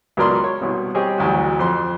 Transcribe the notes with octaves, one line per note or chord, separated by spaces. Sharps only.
C#2 F#3 B3 A#4 D5 C6
C#5
C2 B2
G3 C4 G4 G#4 C#5 D#5
A1 D2 F#3 F#4
F2 C4 C6